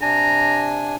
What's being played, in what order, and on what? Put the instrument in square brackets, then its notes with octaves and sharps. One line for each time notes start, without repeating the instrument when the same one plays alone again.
[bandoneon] C3 D4 G#5 [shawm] A#5